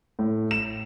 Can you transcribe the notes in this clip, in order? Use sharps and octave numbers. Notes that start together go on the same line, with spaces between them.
A2
E7